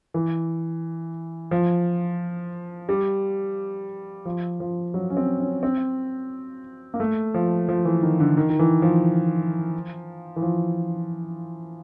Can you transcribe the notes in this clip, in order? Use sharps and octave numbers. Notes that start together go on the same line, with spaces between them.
E3
F3
G3
F3
F3
F#3
C#4
C4
C#4
C4
A#3
A3
F3
F3
E3
D#3
D3
D#3
D#3
E3
F3
E3
F3